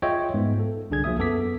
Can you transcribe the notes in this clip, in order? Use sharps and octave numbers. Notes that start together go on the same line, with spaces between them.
F4 G#4 C#5 D#5 E5 G5
G#2 B3
A4
C2 D3 D4 G#4 G#6
F3 F#3 A#3 E5 D#6
F#2 B3 A4 D6 B6